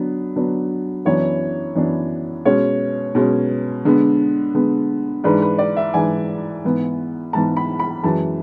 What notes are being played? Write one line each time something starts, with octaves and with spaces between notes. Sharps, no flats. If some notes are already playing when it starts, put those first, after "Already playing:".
Already playing: D3 F#3 B3 D4
D3 F#3 B3 D4
F#2 E3 B3 D4 C#5
F#2 E3 B3 D4
B2 G#3 C#4 C#5
B2 G#3 C#4
D3 G#3 B3
D3 G#3 B3
G#2 E3 G#3 D4 B4
B4
D5
E5
G#2 E3 G#3 D4 G#5
G#2 E3 B3
G#2 E3 B3 A5
B5
B5
F#2 E3 G#3 A5